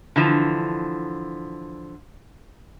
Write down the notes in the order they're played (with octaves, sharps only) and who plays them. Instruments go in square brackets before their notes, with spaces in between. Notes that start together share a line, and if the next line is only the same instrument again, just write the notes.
[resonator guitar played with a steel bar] D3 E3 F3